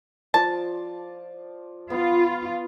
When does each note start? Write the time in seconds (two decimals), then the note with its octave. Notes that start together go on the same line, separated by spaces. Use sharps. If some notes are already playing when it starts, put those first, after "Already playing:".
0.34 F3 D5 A5 C6
1.90 B3 F4